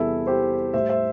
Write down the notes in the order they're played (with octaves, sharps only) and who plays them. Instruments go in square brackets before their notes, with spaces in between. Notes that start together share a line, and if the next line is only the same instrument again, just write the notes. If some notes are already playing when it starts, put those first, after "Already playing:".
Already playing: [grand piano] E2 C3 G3 E4 A4
G4 C5
A2 G3 C5 E5
C5 E5